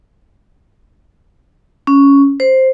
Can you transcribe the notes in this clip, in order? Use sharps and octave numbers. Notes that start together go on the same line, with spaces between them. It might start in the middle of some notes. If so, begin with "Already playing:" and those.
C#4
C5